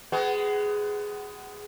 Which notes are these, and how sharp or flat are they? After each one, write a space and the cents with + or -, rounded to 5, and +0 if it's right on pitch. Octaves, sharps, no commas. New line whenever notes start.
G#3 +0 B3 +25 F#4 +35